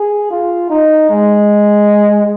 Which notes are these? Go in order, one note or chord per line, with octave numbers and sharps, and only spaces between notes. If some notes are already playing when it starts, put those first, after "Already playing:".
Already playing: G#4
F4
D#4
G#3